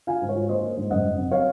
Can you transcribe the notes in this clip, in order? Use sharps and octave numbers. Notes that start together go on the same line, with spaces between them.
F4 F5 G#5
G#2
C#5
F4
A#3 C5 D#5
A#3
G#2
F#1 D#5 F#5
F#1
C3
C#5 F5